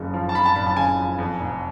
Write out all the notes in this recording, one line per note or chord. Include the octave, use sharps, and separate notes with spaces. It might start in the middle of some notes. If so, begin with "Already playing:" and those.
Already playing: F#1 F2 C#3
F3
A5
F2 B5
A5
F#1 B5
A5
C#3 G#5
F3
F2
F1